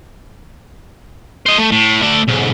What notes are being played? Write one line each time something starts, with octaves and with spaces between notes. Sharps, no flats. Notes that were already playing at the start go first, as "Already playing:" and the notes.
C5 D#5
A3
A2
A3 D5
B1 G#2